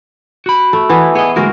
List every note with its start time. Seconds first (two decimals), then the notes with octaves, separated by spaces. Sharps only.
0.46 F#4 B5
0.73 A3
0.89 E3 B3 E4
1.15 B3 G#4 D#5
1.36 D2 G#3 A#3 F#4 A#4